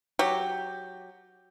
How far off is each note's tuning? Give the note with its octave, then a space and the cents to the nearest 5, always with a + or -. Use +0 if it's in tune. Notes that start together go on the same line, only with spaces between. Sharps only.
F#3 +0 G4 +0